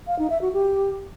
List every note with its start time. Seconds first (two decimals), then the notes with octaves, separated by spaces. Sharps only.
0.07 F5
0.19 D#4
0.30 E5
0.42 F#4
0.53 G4